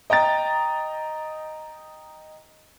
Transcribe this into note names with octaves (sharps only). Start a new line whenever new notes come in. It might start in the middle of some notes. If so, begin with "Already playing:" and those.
D#5 G5 A#5 A6